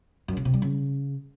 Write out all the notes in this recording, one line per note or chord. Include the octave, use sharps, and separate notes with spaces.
F#2
C#3
C3
G3
C#3